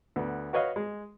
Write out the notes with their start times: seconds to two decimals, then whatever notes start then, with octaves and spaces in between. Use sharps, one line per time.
0.16 D2 B3
0.53 F#4 B4 C#5 D#5 F5
0.76 G#3